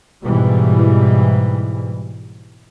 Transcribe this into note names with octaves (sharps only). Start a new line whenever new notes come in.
G#2 B2 E3 G3